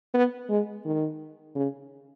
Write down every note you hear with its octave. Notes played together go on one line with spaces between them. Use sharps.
B3
G#3
D#3
C#3